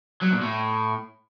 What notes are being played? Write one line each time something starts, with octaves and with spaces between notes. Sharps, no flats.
F#3
A#2
A2